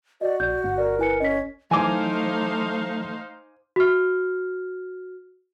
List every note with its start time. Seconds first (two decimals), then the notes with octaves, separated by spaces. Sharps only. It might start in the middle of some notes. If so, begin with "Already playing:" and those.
0.21 F#4 D5 D#5
0.40 A#1 D5 G6
0.64 G1 F#5
0.78 A#4 D5
0.99 E4 B4 G#5 C#7
1.20 C#4 D#5 B6
1.71 E3 F#3 A3 D#4 C5 F5 G#5 D6
3.76 F#4 F6